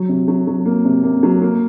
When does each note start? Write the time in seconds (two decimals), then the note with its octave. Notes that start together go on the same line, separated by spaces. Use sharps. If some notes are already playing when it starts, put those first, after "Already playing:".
Already playing: F#3
0.09 C3
0.28 F#3
0.47 F#3
0.66 A#3
0.85 C3
1.04 A#3
1.23 F#3
1.42 A#3